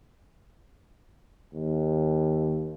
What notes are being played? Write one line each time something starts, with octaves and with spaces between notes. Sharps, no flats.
D#2